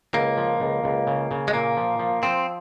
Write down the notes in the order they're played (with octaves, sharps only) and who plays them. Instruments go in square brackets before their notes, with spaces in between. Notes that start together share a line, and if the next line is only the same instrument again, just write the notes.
[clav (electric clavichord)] C#2 [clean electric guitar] A#3
[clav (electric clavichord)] F3
C#2
C#2
C#3
C#3
[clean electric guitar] G#3
[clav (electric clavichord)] A#2 [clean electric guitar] A#3
[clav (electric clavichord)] F3
F3
[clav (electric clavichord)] F3 [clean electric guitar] C4